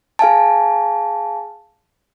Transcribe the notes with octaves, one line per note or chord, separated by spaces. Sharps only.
G#4 F5 G#5 A5